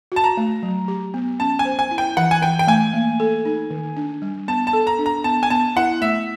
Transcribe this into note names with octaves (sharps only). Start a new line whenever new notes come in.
F#4 A5
A#5
A3
F#3
G4
B3
C#4 A5
G#5
C5
G#5
E4
G5
E3 F#5
G#5
E3 G5
G5
A3 G#5
A#3
A4
D#4
D#3
D4
G3
B3 A5
A5
A4
A#5
D4
A#5
B3 A5
G#5
B3 A5
E4 F#5
A3 E5